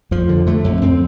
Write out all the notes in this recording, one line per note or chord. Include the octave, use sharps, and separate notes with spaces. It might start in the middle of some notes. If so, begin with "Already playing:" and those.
F2 F3
D3
D3 A3
F2
F2 C4